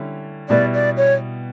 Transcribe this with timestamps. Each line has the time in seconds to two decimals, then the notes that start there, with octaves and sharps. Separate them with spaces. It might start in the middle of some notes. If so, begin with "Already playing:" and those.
Already playing: D3 G3 C#4 E4
0.49 B2 G3 B3 E4 D5
0.74 D5
0.97 C#5